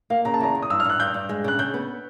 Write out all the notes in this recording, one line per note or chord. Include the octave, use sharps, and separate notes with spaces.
A#3 F5
C#3 A#5
A5
E2 A#5
E2
D#6
G2 E6
F6
G2 F#6
G2 G6
G2
G#3
C#3 F#6
C#3 G6
B3